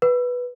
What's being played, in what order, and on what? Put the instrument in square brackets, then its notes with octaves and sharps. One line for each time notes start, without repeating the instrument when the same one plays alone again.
[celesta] B4